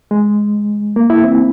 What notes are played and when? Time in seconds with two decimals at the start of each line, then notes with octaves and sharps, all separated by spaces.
0.11 G#3
0.96 A#3
1.10 E4
1.24 C4